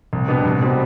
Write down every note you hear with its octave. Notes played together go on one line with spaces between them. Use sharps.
C2
B2 G3 B3 D4
C2
B2 G3 C4 F#4